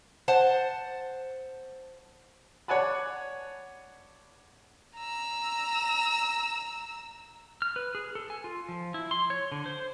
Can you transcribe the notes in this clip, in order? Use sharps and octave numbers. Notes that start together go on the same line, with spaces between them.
C5 F#5 A5
C#5 D5 F#5 G#5 A5 B5
A#5 E6
F6
B4
G#4
A4
G#5
F4
F3
E4
C6
C#5
D3
C5